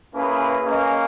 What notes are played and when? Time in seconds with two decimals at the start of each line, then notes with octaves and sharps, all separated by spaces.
0.15 A#3 C#4 E4 G#4 B4
0.66 A#3 C#4 G#4 D#5